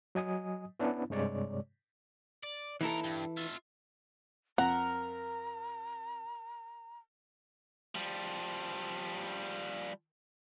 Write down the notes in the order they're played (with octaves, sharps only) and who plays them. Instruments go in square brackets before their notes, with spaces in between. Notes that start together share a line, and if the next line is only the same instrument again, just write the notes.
[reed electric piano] F#3 D#5 G#5 D#6
B3 C#4 D4 E4
G2 C3 G#3 C#5 D5
[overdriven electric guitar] D5
[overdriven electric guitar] D#2 A#4 [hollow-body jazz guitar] E3 E4 A4
[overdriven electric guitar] G2
F4 E5
[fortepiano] F2 [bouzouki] A#4 [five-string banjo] F#5 [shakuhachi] A#5
[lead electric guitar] F3 G3